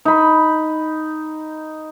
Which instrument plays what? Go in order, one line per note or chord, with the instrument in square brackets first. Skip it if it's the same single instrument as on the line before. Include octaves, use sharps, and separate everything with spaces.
[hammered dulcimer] D#4 B5